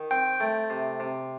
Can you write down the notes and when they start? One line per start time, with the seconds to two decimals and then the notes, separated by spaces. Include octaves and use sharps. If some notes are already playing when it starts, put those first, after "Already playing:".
Already playing: D#3
0.11 C4 G5
0.40 A3
0.70 C3
1.00 C3